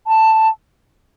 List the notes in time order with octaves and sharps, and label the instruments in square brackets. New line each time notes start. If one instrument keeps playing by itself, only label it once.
[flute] A5